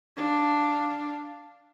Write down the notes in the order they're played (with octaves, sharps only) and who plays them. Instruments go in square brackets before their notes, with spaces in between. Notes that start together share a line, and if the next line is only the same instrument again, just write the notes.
[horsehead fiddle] D4 F5